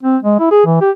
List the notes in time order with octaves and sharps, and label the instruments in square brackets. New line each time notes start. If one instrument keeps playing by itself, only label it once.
[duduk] C4
G#3
E4
G#4
E3
G4